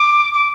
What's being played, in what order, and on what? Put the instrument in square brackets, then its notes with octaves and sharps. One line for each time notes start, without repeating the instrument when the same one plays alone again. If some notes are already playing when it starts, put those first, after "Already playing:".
Already playing: [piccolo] D6
D6